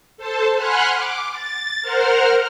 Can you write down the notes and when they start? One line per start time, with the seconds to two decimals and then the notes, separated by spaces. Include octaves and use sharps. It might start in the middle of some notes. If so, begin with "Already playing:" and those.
0.17 A4 C5 A5
0.56 F#5 G#5 B5 C6 F6 F#6
0.95 D6
1.32 A6
1.82 A#4 C5 F#5 F6